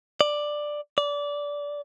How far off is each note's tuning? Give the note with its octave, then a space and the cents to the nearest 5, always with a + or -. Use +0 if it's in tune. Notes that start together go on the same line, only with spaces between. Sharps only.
D5 +10
D5 -20